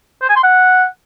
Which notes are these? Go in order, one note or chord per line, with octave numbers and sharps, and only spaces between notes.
C5
G#5
C6
F#5